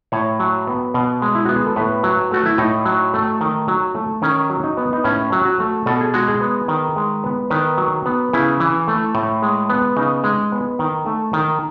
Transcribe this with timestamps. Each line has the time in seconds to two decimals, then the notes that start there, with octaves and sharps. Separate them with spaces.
0.12 A2 C#5
0.40 F#3
0.67 B3
0.94 B2
1.22 G#3
1.35 E4
1.45 B3 F#4
1.56 G#4
1.66 A4
1.76 A2 B4
2.03 F#3
2.31 A3 F#4
2.46 E4
2.58 A2 D#4
2.85 F#3
3.13 A3
3.41 D#3
3.68 F#3
3.95 A3
4.22 D#3 C#4
4.50 F#3
4.64 D#4
4.77 B3
4.93 D#4
5.04 A2 C#4
5.32 F#3
5.45 F#4
5.60 A3
5.86 B2 A4
6.01 G#4
6.14 G#3 F#4
6.28 G#4
6.41 B3
6.68 D#3
6.96 G#3
7.24 B3
7.50 D#3 B4
7.78 F#3
8.06 B3
8.33 C#3 E4
8.60 E3
8.88 A3
9.15 A2
9.42 G#3
9.70 B3
9.97 C#3 D#4
10.24 G#3
10.52 B3
10.79 D#3
11.06 A3
11.33 D#3